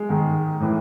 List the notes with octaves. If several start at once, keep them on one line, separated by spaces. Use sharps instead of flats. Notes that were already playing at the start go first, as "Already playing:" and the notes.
Already playing: G#3
G#2 D#3
A2 E3